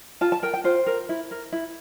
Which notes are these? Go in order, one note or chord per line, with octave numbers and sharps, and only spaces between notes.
F4 A5
A5
A#4 G5
G5
F4 C5
A#4
E4
A#4
E4